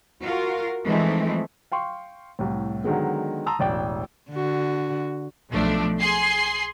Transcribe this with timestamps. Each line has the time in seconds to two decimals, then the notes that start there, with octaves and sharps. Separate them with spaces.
0.23 F4 F#4 A#4
0.85 E3 F3 G#3 A3 C4 D#4
1.72 F5 G5 C6 C#6
2.39 C2 A2
2.84 D3 D#3 F#3 G#3 B3
3.46 A5 A#5 C6 D#6 E6
3.59 E1 A1 D5 G5
4.31 D3 F#4
5.50 B1 F3 A3 D4
6.00 G#4 C6 C7